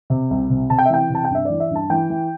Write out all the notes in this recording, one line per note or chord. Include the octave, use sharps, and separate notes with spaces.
C3
C2
C3
C3 A5
G5
E5
E3 G5
C3 A5
G5
G2 E5
E3 D5
E5
G2 A5
E3 G5
E3